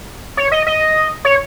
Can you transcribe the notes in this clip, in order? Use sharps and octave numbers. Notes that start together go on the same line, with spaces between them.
C#5
D#5
D#5
C#5